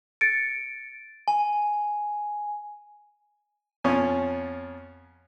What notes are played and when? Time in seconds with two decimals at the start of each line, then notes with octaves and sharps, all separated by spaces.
0.21 A6 C#7 D7
1.28 G#5
3.84 F2 B2 C#4 F4 G#5